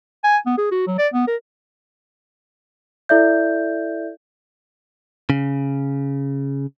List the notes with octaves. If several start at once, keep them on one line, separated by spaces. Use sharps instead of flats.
G#5
B3
G#4
F#4
F#3
D5
B3
A#4
E4 A4 D5 E5 G6
C#3